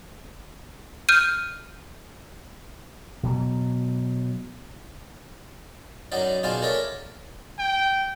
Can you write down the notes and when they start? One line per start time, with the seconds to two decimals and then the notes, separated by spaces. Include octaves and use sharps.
1.09 F6 G6 D#7
3.23 B2 F#3
6.12 F#2 F#3 D#4 D5
6.43 B2 D#4 F4 G#4 D5 A5
6.62 A4 A#4 C#5 D5 E5
7.59 G5